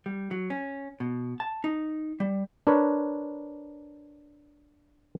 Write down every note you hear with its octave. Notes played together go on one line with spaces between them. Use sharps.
G3
F#3
C#4
B2
A5
D#4
G3
D4 A#4 B4 C#5